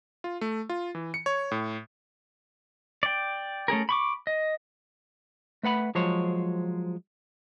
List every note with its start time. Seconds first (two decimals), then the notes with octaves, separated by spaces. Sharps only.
0.24 F4
0.41 A3
0.69 F4
0.95 E3
1.14 C#7
1.26 C#5
1.51 A2
3.03 D5 G5
3.68 A3 C#4 G#4 A#4
3.89 B5 C#6 D6
4.27 D#5
5.63 A3 B4 F#5 B5
5.95 F3 F#3 G#3 C5 C#5